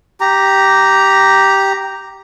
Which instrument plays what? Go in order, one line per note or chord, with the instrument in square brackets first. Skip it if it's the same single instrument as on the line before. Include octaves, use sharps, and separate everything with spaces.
[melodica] G4 A#5